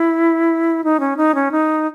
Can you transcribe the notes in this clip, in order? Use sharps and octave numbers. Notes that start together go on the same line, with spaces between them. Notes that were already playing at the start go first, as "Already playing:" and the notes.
Already playing: E4
D#4
C#4
D#4
C#4
D#4